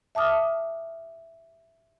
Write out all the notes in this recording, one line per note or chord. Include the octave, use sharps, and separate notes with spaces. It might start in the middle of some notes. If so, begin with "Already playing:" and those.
E5 A5 D6 D#6 F6